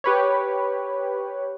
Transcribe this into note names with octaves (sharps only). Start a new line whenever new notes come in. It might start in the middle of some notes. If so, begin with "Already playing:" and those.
G4 B4 C#5